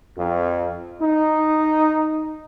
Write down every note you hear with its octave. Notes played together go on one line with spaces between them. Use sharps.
F2
D#4